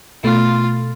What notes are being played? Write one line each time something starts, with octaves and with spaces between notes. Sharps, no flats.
B2 A3 F4